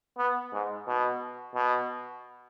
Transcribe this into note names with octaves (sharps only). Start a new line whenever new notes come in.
B3
G#2
B2
B2